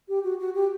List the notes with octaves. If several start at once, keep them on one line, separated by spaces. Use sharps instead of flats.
G4
F#4
F#4
G4